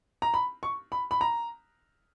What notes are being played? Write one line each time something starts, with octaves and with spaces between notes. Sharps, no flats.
A#5
B5
C#6
B5
B5
A#5